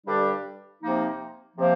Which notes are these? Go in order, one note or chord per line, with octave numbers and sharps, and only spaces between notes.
G2 D3 G3 D4 G4
C3 F3 A#3 D#4
C3 F3 A#3